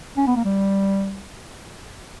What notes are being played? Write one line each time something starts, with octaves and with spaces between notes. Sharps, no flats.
C#4
B3
A#3
G3